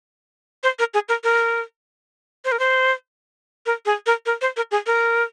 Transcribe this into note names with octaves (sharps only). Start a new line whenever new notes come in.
C5
A#4
G#4
A#4
A#4
C5
A#4
C5
A#4
G#4
A#4
A#4
C5
A#4
G#4
A#4